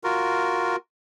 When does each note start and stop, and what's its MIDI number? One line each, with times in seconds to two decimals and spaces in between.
0.04 0.76 65
0.04 0.76 66
0.04 0.76 70